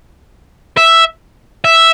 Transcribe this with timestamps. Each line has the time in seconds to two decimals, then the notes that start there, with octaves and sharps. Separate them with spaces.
0.77 E5
1.64 E5